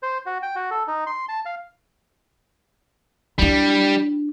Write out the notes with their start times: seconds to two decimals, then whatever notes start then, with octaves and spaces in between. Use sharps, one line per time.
0.03 C5
0.26 F#4
0.42 G5
0.56 F#4
0.71 A4
0.87 D#4
1.07 C6
1.29 A5
1.46 F5
3.39 G3 D4 E4